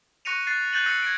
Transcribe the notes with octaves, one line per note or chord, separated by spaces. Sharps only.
C#6 F#6 A#6 C#7 D#7 F7
F#6 A6 C7
F#6 G6 A6 D#7 F#7
E6 F#6 G6 A#6 C#7
G#6 A#6 D7